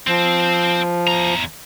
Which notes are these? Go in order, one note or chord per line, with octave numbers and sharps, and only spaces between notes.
F3 C4
E2 A#5